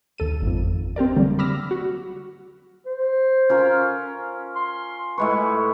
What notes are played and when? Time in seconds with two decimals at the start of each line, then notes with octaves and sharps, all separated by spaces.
0.18 D#2 A4 D#7
0.42 G#1 F2
0.96 C4 G4 A#4 D5
1.16 D3 F#3 G3 A#3
1.39 B5 D6 E6 F6 A#6
1.71 F#4
2.86 C5
3.49 C#4 F4 A#4
4.56 C6
5.18 A2 G#3 B4 C#6